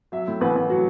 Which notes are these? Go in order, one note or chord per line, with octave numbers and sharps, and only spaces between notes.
F#3 E5
A2
A1 B4
A1
F#3 F#4